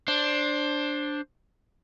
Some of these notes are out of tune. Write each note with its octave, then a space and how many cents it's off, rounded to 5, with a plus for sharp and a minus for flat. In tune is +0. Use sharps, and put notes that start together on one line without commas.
D4 +0 C5 +15